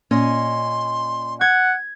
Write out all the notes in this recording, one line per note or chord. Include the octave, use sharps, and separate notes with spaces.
A#2 C#4 D#5 C6
F#5 G#6